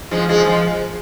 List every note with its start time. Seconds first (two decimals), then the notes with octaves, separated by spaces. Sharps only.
0.11 F3 G#3
0.29 F3 G#3
0.46 F3 G#3